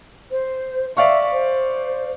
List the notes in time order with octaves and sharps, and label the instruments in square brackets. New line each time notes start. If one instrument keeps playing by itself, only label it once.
[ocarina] C5
[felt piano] D5 F5 C#6 [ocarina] E5
[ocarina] C5